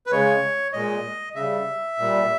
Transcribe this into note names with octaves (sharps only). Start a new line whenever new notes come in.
B4
C#3 G#3 C#5
A#2 G#3 D#5
C#3 G3 E5
A#2 G3